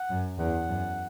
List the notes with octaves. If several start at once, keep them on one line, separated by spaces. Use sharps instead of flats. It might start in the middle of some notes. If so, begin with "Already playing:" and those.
Already playing: F#5
F#2
E2 F#5
F#2